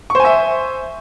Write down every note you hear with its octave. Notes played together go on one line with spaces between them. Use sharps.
C5 E5 G#5 C#6